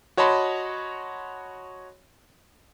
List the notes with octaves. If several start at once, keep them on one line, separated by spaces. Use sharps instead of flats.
F#4 C#5 D#5 A5 B5 C6